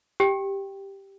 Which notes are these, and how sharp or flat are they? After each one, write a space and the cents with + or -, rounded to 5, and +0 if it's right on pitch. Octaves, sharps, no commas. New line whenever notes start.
G4 +0 G5 +0